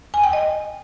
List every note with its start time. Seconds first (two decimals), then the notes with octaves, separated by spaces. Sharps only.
0.14 G#5
0.23 G5
0.33 D#5